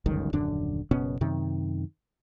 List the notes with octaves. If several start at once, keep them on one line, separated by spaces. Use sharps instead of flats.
G1 C#2 F#2 D#3
D#1 F#2 D3 D4
F#1 B2 B3 C#4
F#2 C3 D#3